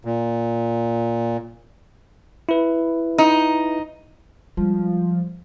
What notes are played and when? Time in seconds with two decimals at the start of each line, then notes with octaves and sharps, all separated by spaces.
0.05 A#2
2.49 E4 B4
3.18 D#4
4.57 F3 G3 G#3